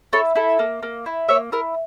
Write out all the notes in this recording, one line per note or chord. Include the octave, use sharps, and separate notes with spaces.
E4 A4 C#5
E4 A4
A#3
A#3
E4
A#3 C#5 E5
E4 A#4